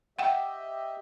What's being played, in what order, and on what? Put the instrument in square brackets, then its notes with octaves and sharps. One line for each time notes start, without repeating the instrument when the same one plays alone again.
[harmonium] G4 D#5 E5 [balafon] F#5 G5